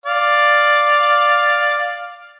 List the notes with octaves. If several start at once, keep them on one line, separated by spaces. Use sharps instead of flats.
D5 F5